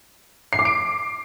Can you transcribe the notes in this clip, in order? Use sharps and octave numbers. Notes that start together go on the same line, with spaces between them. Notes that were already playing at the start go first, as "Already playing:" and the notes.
C7
D6
D7